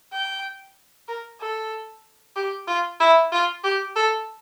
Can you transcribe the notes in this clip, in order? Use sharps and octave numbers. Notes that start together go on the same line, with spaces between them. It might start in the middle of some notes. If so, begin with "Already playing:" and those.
G5
A#4
A4
G4
F4
E4
F4
G4
A4